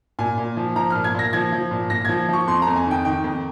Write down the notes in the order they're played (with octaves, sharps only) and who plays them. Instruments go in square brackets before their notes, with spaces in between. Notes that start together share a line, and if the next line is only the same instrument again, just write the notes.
[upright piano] A#2 G#5
A#2
F3
F3 A#5
A#2 F6
G#6
A#2 A#6
F3 G#6
F3
A#2
A#2 A#6
F3 G#6
F3 C#6
F2 C6
F2 A#5
G#5
D#3 G5
D#3 G5
F2